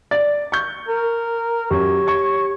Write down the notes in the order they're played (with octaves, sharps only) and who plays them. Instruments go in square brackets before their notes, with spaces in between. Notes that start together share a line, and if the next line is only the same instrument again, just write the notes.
[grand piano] D5 A6
C#6 G6
[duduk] A#4
[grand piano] F#2 [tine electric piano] G4 [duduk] C#5
[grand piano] C#6 G#6